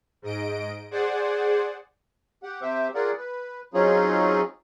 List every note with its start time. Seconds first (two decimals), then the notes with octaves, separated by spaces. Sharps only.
0.22 G#2 D#5 D7
0.91 G#4 C5 D5 F#5
2.43 G4 F#5
2.61 C3 G4 C5 E5
2.95 F4 G#4 A#4 D5 F#5
3.17 B4
3.74 F#3 C4 C#4 D#4 F4 G#4